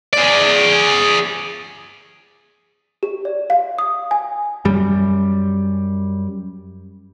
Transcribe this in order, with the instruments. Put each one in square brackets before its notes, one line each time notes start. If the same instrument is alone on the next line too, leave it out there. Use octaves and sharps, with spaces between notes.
[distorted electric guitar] G#4 D5
[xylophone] G4
D5
F5
D#6
G#5
[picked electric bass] F#2 G3